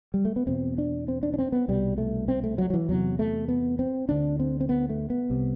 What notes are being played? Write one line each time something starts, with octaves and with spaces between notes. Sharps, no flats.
G3
A3
B3
E2 B2 C4
D4
C4
D4
D4
C4
B3
C2 B2 G3
A3
C4
A3
F#3
F#3
E3
E2 C3 F#3
A3
B3
C4
D2 D3 D4
C4
C4
B3
A3
B3
C2 C3